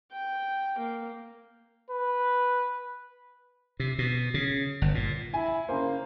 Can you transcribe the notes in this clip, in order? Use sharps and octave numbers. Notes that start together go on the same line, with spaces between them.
G5
A#3
B4
C3
B2
C#3
G1
A#2
E4 G#5
C#3 A#3 C5